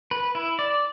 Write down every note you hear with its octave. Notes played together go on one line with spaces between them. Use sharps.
B4
E4
D5